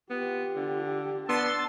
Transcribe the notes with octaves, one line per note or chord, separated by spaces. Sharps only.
B3 F4 G4
D3
B3 D4 A5 C6 E6 A6